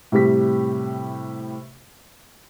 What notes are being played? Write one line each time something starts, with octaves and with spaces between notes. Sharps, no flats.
A2 C3 G3 G4 B6